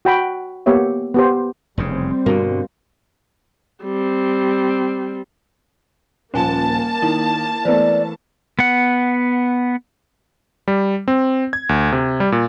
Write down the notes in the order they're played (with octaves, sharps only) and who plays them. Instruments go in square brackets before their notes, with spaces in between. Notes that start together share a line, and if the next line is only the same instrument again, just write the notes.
[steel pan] F#4 G5 B5
A#3 B3 G4 C#5 E5
B3 G4 C5
[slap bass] F1 E2 C#3 [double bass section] G3 C4
[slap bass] G2 B2 D3 [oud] A#3 [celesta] F#4
[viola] G3 C4
[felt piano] D#1 F3 [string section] A#3 A5 [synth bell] C#4 G#5
[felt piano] D#3 [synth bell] E4
[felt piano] E3 A3 [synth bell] B3 B4 C5 [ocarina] D5
[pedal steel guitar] B3 F#5
[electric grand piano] G3
C4
G#6
D2
C3
G3
A#2